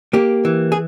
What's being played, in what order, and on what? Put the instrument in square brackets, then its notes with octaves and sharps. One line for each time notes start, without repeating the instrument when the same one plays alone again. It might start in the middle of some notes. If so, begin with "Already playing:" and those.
[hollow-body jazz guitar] A#3 G4
E3
G#4